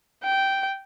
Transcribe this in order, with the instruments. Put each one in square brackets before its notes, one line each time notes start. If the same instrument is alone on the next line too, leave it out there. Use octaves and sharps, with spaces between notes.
[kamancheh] G5